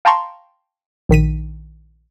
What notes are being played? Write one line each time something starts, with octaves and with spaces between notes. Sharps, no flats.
F5 G5 A5 A#5 C6 C#6
A#1 D#3 B6 D#7